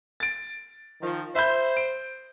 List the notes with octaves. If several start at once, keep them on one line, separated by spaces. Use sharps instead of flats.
A6 D7
D#3 F3
C5 E5 B5 G6
D7